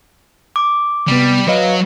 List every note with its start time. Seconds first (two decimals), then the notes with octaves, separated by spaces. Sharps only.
0.56 D6
1.08 C3 G3 B3
1.48 F#3 B4 D#5 F5